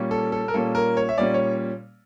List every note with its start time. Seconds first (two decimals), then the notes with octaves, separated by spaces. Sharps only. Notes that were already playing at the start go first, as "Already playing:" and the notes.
Already playing: A#2 G3 A#3 C#4
0.11 A4
0.32 A4
0.48 A#4
0.54 A#2 G3 A#3 C#4 A4
0.75 A#4
0.97 C#5
1.09 E5
1.18 A#2 G3 A#3 C#4 D5
1.34 C#5